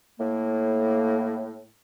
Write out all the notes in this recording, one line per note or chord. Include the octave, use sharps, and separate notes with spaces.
A2 A#3